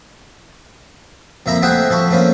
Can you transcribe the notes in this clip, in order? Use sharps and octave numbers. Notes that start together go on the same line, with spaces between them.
F2 A#3 E5 A#5 B5
A3 C4 G#4 E5 F#5 G5
F3 A4 B5 C#6
A3 A#3 C4 C#4